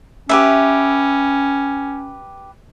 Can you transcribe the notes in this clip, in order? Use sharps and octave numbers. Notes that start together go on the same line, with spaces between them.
C#4 G4 B4 E5